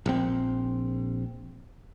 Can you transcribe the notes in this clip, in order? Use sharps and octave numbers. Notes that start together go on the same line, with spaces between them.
A#1 C4